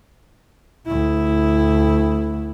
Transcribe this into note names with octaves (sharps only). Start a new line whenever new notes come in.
D2 E4